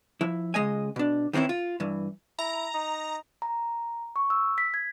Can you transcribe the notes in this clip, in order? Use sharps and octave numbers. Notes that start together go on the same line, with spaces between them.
F3 E4
C#2 G#3 D#5 G#5
B2 D4
D#3 E3 C4 C#4 E4
F4
G2 E3
E4 A#5
D#4
A#5
C#6
E6
B6
G#6